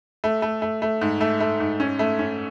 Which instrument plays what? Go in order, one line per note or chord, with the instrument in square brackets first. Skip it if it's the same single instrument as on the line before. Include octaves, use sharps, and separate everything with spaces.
[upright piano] A3
A3
A3
A3
G#2
A3
A3
G#2
C#4
A3
C#4